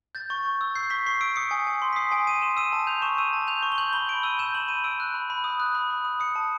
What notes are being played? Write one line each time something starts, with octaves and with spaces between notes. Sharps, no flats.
G6 A6
C#6
C#6
E6
G6 C7
C#6 B6
C#6 C7
E6 D7
D#6 C#7
G#5
G#5
C6
B6
D#6 C7
G#5 D7
G#5 D#7
C6 E7
E6 D#7
A5
G6 F7
C#6 E7
E6 D#7
A5
G6 F7
C#6
G7
G6 F#7
B5 G7
B5 D7
E6 D#7
G6 E7
B5 F#7
B5 D#7
E6 D7
F#6
B5
B5
D#6
F#6
B5
B5
D#6
D#6 C#7
A5